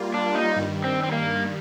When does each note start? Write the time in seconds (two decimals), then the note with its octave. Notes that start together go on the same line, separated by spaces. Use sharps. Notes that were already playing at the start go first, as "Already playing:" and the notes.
Already playing: G3 A#3 F4
0.14 D4
0.35 D#4
0.56 G2 D#3 G3
0.84 C4
1.03 C4
1.12 A#3